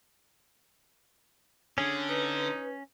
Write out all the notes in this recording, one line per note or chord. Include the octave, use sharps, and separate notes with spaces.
D3 C#4 G#4
D#4 B4